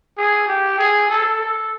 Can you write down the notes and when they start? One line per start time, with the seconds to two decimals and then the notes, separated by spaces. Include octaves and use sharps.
0.18 G#4
0.48 G4
0.78 G#4
1.09 A4
1.40 A4